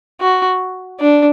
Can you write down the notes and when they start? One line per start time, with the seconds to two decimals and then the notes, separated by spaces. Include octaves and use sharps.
0.21 F#4
1.00 D4